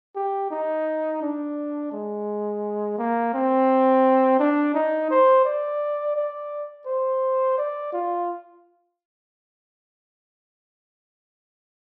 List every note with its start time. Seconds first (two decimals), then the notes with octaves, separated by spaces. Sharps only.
0.16 G4
0.51 D#4
1.22 D4
1.92 G#3
2.98 A#3
3.34 C4
4.39 D4
4.74 D#4
5.11 C5
5.45 D5
6.16 D5
6.86 C5
7.58 D5
7.93 F4